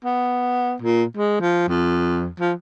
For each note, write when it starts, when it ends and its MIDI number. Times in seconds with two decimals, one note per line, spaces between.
0.05 0.75 59
0.82 1.04 46
1.17 1.39 56
1.41 1.65 53
1.68 2.28 41
2.40 2.53 53